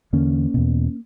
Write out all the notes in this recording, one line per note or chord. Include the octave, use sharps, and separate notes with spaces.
E2 D3 A#3 C#4
E2 B2